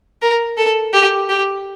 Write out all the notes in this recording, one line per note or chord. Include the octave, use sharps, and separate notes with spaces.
A#4
A4
G4
G4